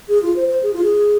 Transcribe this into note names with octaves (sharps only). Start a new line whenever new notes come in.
G#4
F4
C5
C5
G#4
F4
G#4